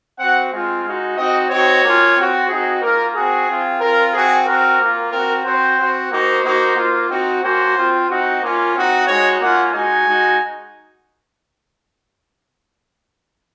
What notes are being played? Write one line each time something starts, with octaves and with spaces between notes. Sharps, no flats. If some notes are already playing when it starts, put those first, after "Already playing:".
C4 F#4 F#5
G#3 C4 F4 F5
G#3 D#4 F#4
C4 D#4 F#4 D#5
C4 D#4 F#4 C#5
A#3 C#4 F4
C4 F#4
C4 D#4 F#4 G#4
A#3 F4 A#4
C4 F#4 G#4
C4 F4
C4 F4 A#4
C4 F#4 G#4
C4 F#4 A#4
A#3 F4
C4 F#4 A#4
C4 F#4 C5
C4 F#4
A#3 D#4 F#4 C5
A#3 D#4 F#4
A#3 F4
C4 D#4 F#4
A#3 C#4 F#4 C5
C4 F4
C4 D#4 F#4
A#3 C#4 F4
C4 D#4 F#4
G#3 D#4 F#4 C#5
A#3 C#4 F4 F#5
G#3 D#4 F#4 G#5
G#3 D#4 F#4